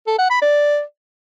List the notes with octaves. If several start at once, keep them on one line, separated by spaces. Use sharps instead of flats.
A4
F#5
B5
D5